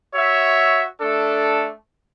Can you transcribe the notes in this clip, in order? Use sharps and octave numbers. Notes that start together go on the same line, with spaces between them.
F#4 C#5 E5
A3 D4 A4